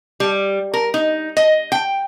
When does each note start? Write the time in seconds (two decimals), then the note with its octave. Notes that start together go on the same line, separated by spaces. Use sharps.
0.20 G3
0.74 A#4
0.94 D#4
1.37 D#5
1.72 G5